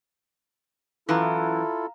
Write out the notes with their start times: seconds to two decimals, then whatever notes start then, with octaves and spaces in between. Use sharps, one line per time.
1.09 F#2 E3 E4 F4 A4 F5 A#5